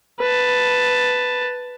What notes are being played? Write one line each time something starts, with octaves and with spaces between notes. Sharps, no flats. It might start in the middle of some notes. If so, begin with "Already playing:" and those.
B4 A5